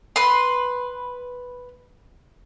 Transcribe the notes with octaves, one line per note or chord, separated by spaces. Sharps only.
B4 C6